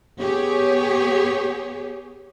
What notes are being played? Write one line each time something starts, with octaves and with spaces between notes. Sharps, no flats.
B3 G4 G#4 C#5